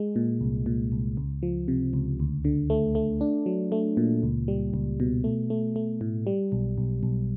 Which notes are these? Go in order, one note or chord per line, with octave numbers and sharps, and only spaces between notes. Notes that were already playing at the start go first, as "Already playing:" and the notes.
Already playing: G#3
A#2
C2
A#2
C2
C#2
F3
C3
C#2
D2
D3
A3
A3
D4
F#3
A3
A#2
C#2
G3
C#2
B2
A3
A3
A3
A2
G3
B1
B1
B1